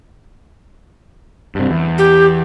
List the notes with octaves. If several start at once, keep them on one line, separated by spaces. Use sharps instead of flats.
G2 C3
E2
G4